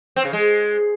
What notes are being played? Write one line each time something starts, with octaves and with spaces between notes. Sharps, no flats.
C4
C#3
G#3